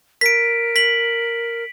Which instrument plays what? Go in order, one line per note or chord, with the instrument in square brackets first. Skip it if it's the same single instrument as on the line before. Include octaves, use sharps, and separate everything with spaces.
[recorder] A#4 [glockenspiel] B6 D7
[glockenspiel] B6 F#7